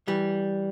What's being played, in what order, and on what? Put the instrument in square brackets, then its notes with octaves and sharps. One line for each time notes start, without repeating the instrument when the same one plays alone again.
[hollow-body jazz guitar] E3 G3